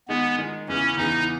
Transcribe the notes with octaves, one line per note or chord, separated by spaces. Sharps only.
D#3 G#3 B3 D#4 G#4
D#3 G#3 D#4 G#4
E2 C#3 E3 B3 C#4
E2 C#3 E3 B3 D#4